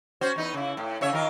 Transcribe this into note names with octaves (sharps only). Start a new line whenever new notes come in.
C#4 F#4 C5
E2 D#4 B4
C#3 E4
A2
C#3 C#5 E5
D#3 F4 A#4